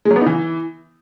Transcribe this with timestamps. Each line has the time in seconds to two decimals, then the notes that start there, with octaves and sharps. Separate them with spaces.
0.05 G#3
0.11 F#3
0.16 B3
0.21 D#4
0.26 E3